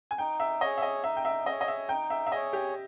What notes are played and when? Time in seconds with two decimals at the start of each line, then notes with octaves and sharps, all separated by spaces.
0.11 G#5
0.18 D#4 G5
0.40 E5
0.61 G#4 C#5 D#5
0.78 E5
0.82 D#5
1.04 D#4 E5
1.17 G5
1.25 E5
1.46 G#4 C#5 D#5
1.61 D#5
1.68 E5
1.89 D#4 G5
2.10 E5
2.27 E5
2.32 G#4 C#5 D#5
2.53 G4